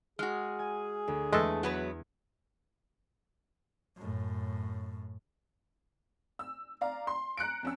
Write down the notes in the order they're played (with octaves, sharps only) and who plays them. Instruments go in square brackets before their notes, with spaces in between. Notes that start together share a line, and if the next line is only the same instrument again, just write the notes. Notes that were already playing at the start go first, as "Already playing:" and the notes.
[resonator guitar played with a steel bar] G#3 F#4 [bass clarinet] G#4 [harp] F6
[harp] G#5
D2
[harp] E2 [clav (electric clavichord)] G#3 A4 [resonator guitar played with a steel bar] A3
[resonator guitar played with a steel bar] F#3 B3 B4 [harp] G#6
[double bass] F#2 A2
[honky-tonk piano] E6
D5 F5 A#5
C6
A#5 F#6 C#7 D7
F2 C#4 E6